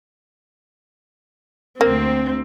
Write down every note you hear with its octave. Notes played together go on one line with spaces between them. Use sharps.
D2 A#3 C4